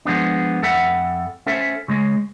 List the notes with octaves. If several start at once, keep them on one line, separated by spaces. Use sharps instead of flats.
F3 G#3 B3 D4
F2 A4 E5 F#5 B5
C#4 A4 C5 E5
C#3 G#3